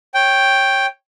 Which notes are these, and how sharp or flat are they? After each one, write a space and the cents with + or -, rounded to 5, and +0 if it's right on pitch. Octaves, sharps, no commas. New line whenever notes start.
C#5 -15 G5 +0